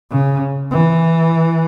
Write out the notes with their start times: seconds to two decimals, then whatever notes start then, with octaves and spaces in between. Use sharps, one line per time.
0.11 C#3
0.71 E3